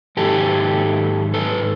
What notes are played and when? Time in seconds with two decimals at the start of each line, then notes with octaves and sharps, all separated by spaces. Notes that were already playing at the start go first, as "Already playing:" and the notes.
0.17 G#2 D#3 F#3 G4 A4
1.34 A4 B4